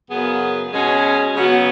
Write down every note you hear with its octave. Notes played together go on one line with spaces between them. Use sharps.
F#2 C#3 B3 G#4
B2 G#3 C#4 G#4
C#3 F#3 B3 F#4